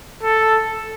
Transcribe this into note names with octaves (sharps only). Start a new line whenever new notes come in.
A4